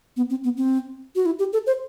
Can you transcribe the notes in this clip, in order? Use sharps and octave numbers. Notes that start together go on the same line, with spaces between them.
B3
C4
B3
C4
F#4
E4
G4
A4
C5